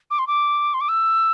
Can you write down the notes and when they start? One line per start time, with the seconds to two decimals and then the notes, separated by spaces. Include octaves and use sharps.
0.10 D6
0.19 C6
0.27 D6
0.74 C6
0.80 D6
0.88 E6